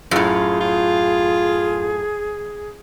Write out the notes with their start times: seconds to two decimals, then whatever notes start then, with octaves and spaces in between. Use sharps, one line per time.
0.11 F#2 A2 F4 G#4
0.60 F4